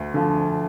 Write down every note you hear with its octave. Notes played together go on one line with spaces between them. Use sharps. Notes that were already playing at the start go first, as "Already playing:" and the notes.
Already playing: D2
D3 F3